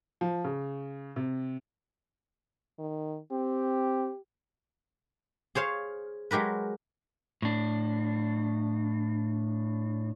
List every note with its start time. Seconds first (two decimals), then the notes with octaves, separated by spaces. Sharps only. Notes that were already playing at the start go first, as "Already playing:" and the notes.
0.21 F3
0.44 C#3
1.16 C3
2.79 D#3
3.32 C4 G4
5.55 G#4 C5 C#5 F5
6.31 F#3 G#3 G4 A#4 B4
7.42 A2 D4